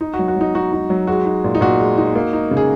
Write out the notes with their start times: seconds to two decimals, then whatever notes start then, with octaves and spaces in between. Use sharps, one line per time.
0.01 D#4
0.14 F#4
0.19 F#3
0.28 F#4
0.36 F#3 D#4
0.55 D#4 F#4
0.73 D#4
0.90 F#3
1.07 G#3 F#4
1.25 D#4
1.44 A#2
1.55 D#4
1.61 A#2 F#4
1.80 G#3
1.98 D#4
2.15 A#3
2.33 D#4
2.51 C#3
2.57 G#4